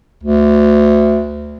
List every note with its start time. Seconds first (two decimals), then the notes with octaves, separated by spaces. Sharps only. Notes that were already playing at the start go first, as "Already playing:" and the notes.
0.23 D2